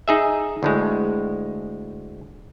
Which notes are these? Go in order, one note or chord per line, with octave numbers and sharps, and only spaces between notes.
D#4 G#4 E5
D2 A2 G#3